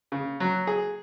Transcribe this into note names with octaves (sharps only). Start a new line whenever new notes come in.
C#3
F#3
G#4